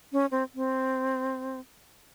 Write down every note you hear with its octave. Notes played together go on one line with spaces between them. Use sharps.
C#4
C4
C4